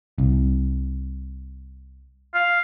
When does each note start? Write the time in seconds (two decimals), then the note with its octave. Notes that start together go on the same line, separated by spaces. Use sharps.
0.18 C2
2.34 F5